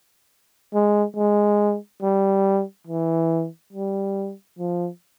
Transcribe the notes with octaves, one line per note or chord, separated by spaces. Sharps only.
G#3
G#3
G3
E3
G3
F3